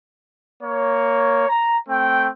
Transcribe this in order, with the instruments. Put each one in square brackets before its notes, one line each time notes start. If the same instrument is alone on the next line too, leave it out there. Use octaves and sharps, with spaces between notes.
[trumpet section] A#3 C#5
A#5
A3 C4 G5